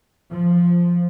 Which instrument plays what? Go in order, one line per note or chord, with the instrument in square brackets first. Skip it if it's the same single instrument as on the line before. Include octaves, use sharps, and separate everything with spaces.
[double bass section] F3